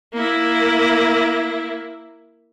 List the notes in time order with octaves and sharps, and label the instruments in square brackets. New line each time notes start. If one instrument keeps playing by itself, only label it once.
[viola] A#3 E4